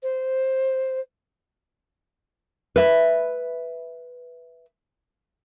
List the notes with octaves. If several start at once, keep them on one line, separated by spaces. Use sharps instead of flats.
C5
B4 E5